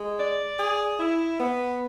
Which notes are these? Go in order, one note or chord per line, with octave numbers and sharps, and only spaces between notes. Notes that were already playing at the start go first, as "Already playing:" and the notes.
Already playing: G#3
D5
G#4
E4
B3